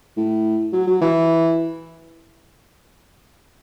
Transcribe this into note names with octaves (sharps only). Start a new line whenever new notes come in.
A2
F#3
F#3
E3